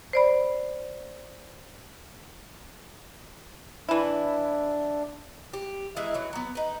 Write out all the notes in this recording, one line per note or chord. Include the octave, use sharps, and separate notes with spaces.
C5 D5 B5
E3 D4 E4
G4
E3 G#3 D#4 E4
E3 F#3
F#3 B3
D#4 B4